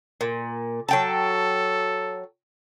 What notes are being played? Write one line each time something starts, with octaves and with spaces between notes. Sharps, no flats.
A#2
F#3 A4 G5 A5